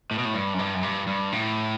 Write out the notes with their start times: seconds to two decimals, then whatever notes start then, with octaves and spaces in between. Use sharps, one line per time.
0.11 A2
0.18 B2
0.25 A2
0.34 G2
0.54 F#2
0.59 G2
0.74 F#2
0.83 G2
1.07 G2
1.32 A2